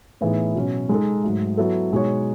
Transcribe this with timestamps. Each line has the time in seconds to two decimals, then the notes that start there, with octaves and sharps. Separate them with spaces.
0.21 A2 E3 B3 D#4 G#4
0.55 B2 F#3 C#4
0.89 G#3 D#4 A4
1.23 G#2 F#3 A3
1.57 F#3 B3 E4 A4
1.92 B2 G#3 D#4 F#4 C#5